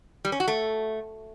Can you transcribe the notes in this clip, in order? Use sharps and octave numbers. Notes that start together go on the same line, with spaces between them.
G3
C#4
F#4
A3